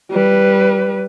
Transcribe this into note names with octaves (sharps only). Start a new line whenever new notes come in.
G3 B4